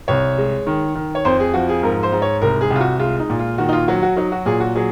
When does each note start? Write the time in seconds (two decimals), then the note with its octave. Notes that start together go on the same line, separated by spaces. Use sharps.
0.08 C2 C#5
0.38 G#3
0.67 D#3
0.95 D#3
1.15 C#5
1.25 F2 C5
1.40 G#4
1.54 F3 F#4
1.69 G#4
1.83 G#2 A#4
2.03 C5
2.12 G#2
2.22 C#5
2.41 C2 A#4
2.61 G#4
2.70 C2
2.76 F4
2.81 F#4
2.99 G#3 F4
3.20 D#4
3.29 A#2
3.39 F4
3.58 D#3 F#4
3.69 D#4
3.73 F4
3.88 F#3 F#4
4.02 F#4
4.17 F#3 D#4
4.32 F#4
4.46 A#2 G#4
4.60 F#4
4.75 F#3 G#4